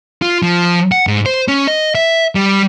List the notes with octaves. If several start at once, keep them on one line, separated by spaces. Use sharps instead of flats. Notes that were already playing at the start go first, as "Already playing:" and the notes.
F4
F3
F#5
G#2
C5
C#4
D#5
E5
G3